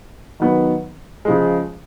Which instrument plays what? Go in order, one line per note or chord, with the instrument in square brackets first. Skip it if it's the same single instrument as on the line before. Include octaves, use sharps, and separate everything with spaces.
[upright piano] D#3 F#3 B3
C#3 F3 G#3